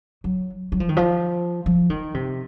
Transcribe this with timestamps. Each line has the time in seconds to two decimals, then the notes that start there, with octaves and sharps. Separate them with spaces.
0.24 F#3
0.72 F#3
0.80 F3
0.89 D#3
0.97 F3
1.66 F3
1.90 D#3
2.14 C3